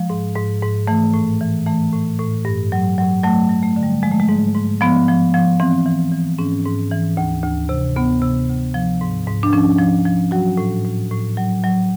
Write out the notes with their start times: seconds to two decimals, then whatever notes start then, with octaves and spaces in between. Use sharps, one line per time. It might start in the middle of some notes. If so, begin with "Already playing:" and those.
Already playing: F3 G#3
0.10 G#2
0.36 G#2
0.62 G#2
0.88 E3 A3
1.14 A2
1.41 E3
1.66 E3 A3
1.93 A2
2.19 A2
2.45 G2
2.72 F#3
2.98 F#3
3.24 F#3 A3
3.50 F#3
3.63 A3
3.76 D3
3.83 G3
4.02 F3 G#3
4.11 A3
4.20 G#3
4.29 G#2
4.54 G#2
4.81 F3 B3
5.08 F3
5.34 F3
5.60 E3 C4
5.86 E3
6.12 E3
6.38 G#2 C#4
6.65 G#2
6.91 E3
7.17 D2
7.43 D2
7.69 C3
7.96 D2 B3
8.22 C3
8.49 D2
8.74 F3
9.01 G#2
9.27 G#2
9.43 D4
9.53 F3 C#4
9.79 F3
10.06 F3
10.31 F#3 F#4
10.58 A2
10.85 A2
11.11 A2
11.37 F#3
11.63 F#3